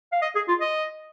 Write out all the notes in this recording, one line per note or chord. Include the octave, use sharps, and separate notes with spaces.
F5
D#5
G#4
F4
D#5